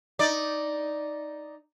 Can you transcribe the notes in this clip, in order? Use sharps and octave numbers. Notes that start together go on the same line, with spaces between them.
D#4 D5